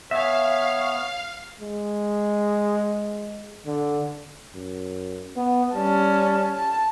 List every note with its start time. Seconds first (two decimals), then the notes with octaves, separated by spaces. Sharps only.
0.11 B3 C#5 E5 F5 G#5
1.61 G#3
3.66 D3
4.55 F#2
5.36 B3
5.74 G3 C#4 A5
6.56 A5